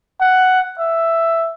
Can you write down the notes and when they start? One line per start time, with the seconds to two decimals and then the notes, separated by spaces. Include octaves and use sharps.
0.21 F#5
0.79 E5